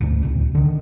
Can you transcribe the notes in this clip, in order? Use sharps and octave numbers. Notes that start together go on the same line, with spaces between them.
G#1 D2
D1 C2
D3 D#3